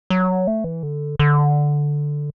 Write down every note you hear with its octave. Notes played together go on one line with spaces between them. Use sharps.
F#3
A3
E3
D3
D3